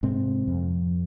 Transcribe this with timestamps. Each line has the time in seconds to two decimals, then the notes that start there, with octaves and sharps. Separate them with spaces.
0.03 G#2 C3 C4
0.48 F2